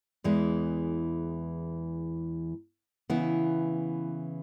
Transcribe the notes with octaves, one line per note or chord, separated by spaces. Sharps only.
E2 E3 G#3 E4
C#3 E3 B3 E4